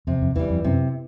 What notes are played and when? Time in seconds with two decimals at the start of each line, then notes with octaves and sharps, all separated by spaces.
0.07 F2 C3
0.22 F2
0.36 E2 E3
0.39 G3
0.50 F2
0.64 F#2 C3